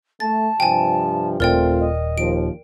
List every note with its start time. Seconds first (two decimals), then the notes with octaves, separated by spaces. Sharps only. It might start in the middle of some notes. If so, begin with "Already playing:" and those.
0.20 A3 A5 A6
0.60 G2 C3 F3 G5 G#5
1.40 D#1 A3 C4 F4 A#4 D5 G5
1.79 D#5
2.18 D#2 F3 D7